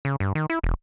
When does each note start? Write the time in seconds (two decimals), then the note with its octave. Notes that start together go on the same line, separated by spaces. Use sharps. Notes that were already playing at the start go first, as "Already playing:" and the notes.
0.05 C#3
0.20 G2
0.35 D#3
0.50 E4
0.64 E1